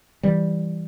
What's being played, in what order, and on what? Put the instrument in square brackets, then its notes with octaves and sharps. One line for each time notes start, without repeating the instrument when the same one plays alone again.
[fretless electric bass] E3 G3